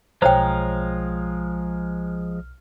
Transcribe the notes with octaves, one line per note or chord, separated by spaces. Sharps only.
B1 F3 G#3 C5 C#5 G5 A#5 F6